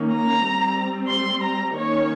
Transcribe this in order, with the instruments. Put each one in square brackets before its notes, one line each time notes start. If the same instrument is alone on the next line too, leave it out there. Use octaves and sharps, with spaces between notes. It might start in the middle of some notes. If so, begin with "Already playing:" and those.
Already playing: [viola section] D#3 A#3 C#4
A#5
G3 C4
C6
A#5
D#3 A#3 C#4 C#5